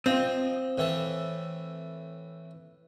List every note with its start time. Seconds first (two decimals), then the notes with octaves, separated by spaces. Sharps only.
0.06 F3 C4 D#5
0.78 A2 E3 A5